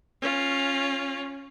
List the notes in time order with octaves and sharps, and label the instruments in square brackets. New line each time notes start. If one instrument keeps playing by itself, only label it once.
[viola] C#4 F4